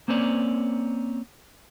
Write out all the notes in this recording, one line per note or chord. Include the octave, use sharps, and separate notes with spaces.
A#3 C4 C#4 D5